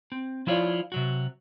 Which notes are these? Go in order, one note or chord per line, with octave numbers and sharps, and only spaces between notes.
C4
F3 E4 F4 C#5 D5
C3 F#3 F#4